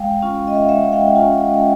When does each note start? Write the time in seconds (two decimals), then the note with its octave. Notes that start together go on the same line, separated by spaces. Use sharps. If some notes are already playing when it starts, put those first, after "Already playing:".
Already playing: G#3 F5 G5
0.22 C#4 F4
0.47 D#5
0.55 E5
0.62 F5
0.69 G#3 E5 F#5
0.92 F5 G5
1.07 G5
1.16 F4 F#5 G#5
1.20 C#4